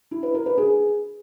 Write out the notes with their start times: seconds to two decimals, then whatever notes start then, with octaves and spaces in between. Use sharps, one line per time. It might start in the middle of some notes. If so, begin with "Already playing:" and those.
0.11 E4
0.23 B4
0.34 A#4
0.46 B4
0.58 G#4